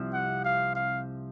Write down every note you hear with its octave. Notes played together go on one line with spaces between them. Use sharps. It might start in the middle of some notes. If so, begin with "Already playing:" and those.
Already playing: C2 C3 F3
F#5
F5
F5